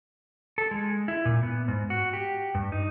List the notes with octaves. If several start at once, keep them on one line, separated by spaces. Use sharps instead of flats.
A4
G#3
E4
A#2
B3
G#2
F#4
G4
G2
D#4